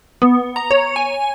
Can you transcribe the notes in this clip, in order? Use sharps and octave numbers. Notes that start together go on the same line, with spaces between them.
B3
A#5
C#5
G#5